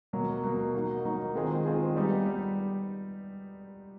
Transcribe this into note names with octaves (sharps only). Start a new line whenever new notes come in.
B2 F#3 A#3
B2 F#3 A#3
F#3 A#3 D#4 F#4
F#3 A#3 D#4 F#4
D#3 G#3 C4 F4 G#4
D#3 G#3 C4 F4 G#4
G3 B3 D#4 G4
G3